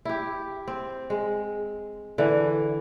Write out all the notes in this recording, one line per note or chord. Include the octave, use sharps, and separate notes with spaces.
E4 G4
C4
G#3
D3 E3